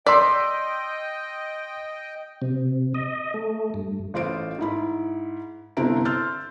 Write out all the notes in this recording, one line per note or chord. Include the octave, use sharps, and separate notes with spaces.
D5 D#5 G5 C6 E6 B6
C3
D#5
A3
G2
A1 F4 C5 D7
G#2 E4 B5
G1 C3 C4 E4 A#5 D7
C6 E6 F6 G6 A6